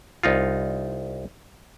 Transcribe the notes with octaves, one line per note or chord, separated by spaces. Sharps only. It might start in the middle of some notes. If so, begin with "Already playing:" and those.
C2 D#4 F4